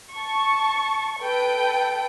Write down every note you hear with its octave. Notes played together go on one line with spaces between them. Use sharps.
A5 C#6
A4 B4 G5